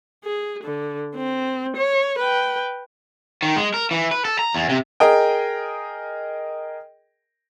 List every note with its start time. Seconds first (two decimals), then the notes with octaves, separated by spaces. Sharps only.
0.24 G#4
0.64 D3
1.16 C4
1.77 C#5
2.18 B4 G5
3.43 D#3
3.56 G#3
3.74 A#4
3.91 E3
4.11 B4
4.25 A4
4.39 A#5
4.54 E2
4.69 C3
5.00 G#4 A#4 D#5 G5